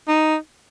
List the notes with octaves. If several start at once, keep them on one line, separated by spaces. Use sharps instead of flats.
D#4